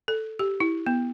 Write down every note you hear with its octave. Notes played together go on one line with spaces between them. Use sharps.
A4
G4
E4
B3